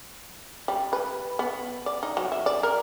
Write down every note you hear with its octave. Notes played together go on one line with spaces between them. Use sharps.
G3
B4
B3
D5
D#4
F#3
E5
D5
A#4